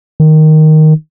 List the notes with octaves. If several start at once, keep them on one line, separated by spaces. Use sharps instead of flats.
D#3